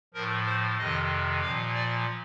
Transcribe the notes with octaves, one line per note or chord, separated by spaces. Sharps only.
A2 F3 A#4
C5
F2 C3 D#3 D#5
A#2 F3 F5
D5